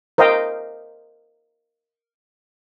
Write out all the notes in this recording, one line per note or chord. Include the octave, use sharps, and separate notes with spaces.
A#4 C5 D#5 F5 G5